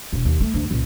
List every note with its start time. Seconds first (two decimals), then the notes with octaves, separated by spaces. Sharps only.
0.13 E1
0.25 D#2
0.40 A3
0.54 D2
0.70 C#2 A#2